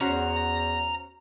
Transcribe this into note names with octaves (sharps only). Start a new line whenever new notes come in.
E2 C#4 F#4 C5 A#5